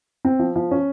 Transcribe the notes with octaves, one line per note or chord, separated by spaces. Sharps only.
C4
F3
F3
C#4